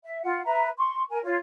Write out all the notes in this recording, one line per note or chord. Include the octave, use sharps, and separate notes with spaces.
E5
F4 F#5
B4 E5 A#5
C6 C#6
A#4 G#5
F4 C#5